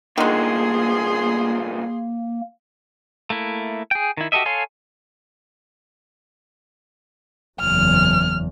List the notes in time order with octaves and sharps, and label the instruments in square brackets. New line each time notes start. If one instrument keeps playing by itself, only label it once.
[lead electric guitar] C2 A#2 [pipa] D3 D#3 [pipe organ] A#3 [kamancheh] G#4 C6
[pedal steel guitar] A3 A#3 E4
G#4 G5
D#3 E4
F#4 G4 A4 D#5 E5
A4 C#5 F5 G#5 C6
[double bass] F#1 E2 [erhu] F6